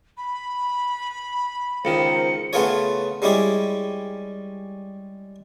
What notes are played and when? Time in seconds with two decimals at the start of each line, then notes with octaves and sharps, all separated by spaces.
0.17 B5
1.85 C#2 D#3 A#4 C5 C#7
2.53 C#3 A3 B3 F4 G#4 C#5
3.22 G3 G#3 C#4 E4 G4 G#4